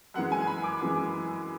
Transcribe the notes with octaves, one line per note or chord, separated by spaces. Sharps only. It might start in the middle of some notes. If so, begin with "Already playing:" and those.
F#2 E3 G#3 F#5
G#5
B5
D6
F#2 E3 G#3